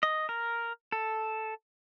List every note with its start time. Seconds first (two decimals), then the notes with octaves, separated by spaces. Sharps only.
0.03 D#5
0.29 A#4
0.92 A4